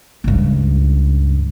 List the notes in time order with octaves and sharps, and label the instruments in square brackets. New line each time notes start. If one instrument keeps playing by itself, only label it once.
[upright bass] C#2 G2